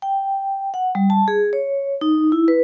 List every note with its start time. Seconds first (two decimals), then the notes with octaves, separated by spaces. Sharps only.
0.02 G5
0.74 F#5
0.95 G3
1.10 A5
1.28 G#4
1.53 C#5
2.01 D#4
2.32 E4
2.48 B4